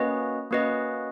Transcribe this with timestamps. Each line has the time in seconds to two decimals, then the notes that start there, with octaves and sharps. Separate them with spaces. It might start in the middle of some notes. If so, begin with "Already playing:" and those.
Already playing: A#3 C#4 F#4 B4 D#5
0.51 A#3 C#4 F#4 B4 D#5